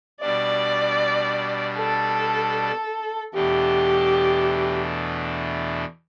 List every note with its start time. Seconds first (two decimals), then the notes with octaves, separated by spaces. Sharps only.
0.21 B2 G3 D4 D5
1.78 A4
3.34 E2 B2 A3 D4 G4